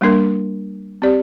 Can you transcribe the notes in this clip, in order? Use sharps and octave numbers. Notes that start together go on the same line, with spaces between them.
G3 A#3 D4 A#4
C4 G4 D5